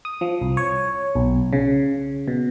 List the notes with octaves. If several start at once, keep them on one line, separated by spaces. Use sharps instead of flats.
D#6
F3
C2
C#5
B1
C#3
B2